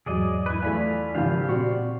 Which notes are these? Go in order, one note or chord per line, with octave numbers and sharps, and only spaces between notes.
E2 G#2 F#3 G#4 D5 D#5
E4 B4
E2 A3 F4 D5 G#5 B5
G#1 C#2 F3 G4 F5
A#2 C4 F#4 D5 C#6